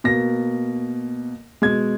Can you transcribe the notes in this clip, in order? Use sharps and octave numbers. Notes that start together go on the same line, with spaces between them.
B2 A#3 A#6
B2 G#3 G#6